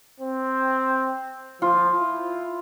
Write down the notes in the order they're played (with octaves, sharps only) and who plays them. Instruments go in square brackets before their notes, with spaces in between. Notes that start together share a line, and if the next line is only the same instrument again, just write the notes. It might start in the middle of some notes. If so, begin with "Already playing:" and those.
[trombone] C4
[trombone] F3 [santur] F4
[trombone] E4